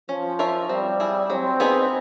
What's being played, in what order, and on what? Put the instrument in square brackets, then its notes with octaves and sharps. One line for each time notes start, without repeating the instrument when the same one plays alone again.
[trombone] F3 [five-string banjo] C#4
[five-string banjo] F4 A#4 C#5 E5
[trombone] G3 [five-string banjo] C4
[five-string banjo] E4 G#4
[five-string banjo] F#3 [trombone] C4
[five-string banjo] B3 D#4 G#4 B4